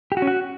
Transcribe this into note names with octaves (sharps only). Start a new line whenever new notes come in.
G4
F#4
C#4
F#4